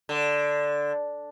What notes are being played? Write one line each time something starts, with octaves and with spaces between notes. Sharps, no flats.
D3